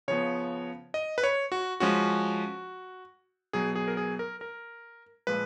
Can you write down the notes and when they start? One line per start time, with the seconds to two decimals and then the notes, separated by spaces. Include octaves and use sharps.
0.08 C#3 F3 B3 C#5
0.94 D#5
1.18 B4
1.23 C#5
1.52 F#4
1.80 F3 G#3 C#4 F#4
3.53 B2 F#3 B3 G#4
3.75 G#4
3.88 A#4
3.97 G#4
4.19 A#4
4.41 A#4
5.27 A#2 F3 G#3 B4